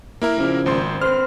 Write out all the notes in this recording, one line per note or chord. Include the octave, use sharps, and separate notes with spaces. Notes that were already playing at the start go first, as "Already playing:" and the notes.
A#3 E4 A#4
A#2 C#3 F3
G#1 C5 C6
C4 B4 C5 F6